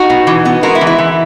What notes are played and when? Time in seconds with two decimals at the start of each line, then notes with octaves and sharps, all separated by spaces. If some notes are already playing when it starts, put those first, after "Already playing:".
Already playing: D#4 F#4
0.10 B2
0.27 E3
0.45 B3
0.63 G#3 F#4 A#4
0.75 E4
0.81 E3
0.87 E4
0.98 E3